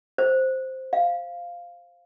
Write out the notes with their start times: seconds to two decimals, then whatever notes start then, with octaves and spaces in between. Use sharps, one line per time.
0.18 C5
0.93 F5